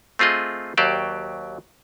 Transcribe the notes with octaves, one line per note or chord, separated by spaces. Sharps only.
A3 C4 F4 G#4 D#5
D#2 F#3 G4 C5 D5